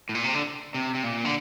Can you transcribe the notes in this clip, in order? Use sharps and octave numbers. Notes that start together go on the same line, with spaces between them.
A2
A#2
C3
D3
C3
C3
A#2
D3